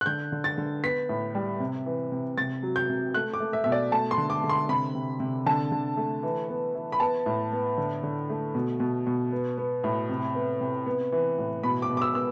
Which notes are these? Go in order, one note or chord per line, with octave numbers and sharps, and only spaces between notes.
F#6
D3 G6
D3
A6
D3
B3 B6
A2
G3
C3
E3
C3
C3 A6
F#3
G6
C3
A3 F#6
D6
A3
E5
B2 E5
D5
A3 A5
C6
D3
D6
D3
C6
C3 B5
C3
C3
D3 A5
D3
A3
E3
B3
E3
B5
B3 A5
A2
B3
D3
D3
A3
B2
B2
B2
B3
B3
A2
C3
B3
C3
B3
E3
A2
B2 B5
D6
B2
D6
E6
B3 E6